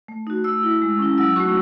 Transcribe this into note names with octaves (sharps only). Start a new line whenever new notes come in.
A3
D#4 F#4
A3 E6
E4
G#3
C#4 E4
F#3 E6
A3 D#4 F#4 C#6